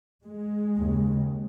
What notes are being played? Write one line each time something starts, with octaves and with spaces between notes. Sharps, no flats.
G#3
D#2 C#3